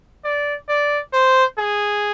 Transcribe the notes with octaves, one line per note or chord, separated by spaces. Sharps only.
D5
D5
C5
G#4